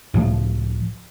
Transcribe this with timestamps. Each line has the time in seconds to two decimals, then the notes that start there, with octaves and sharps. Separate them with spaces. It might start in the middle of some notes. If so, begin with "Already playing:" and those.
0.14 C#2 A2 F3 A3